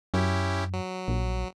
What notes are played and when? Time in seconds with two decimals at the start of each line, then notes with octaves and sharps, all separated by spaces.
0.14 F#2 C#4 E4 G4
0.73 F#3
1.08 A#1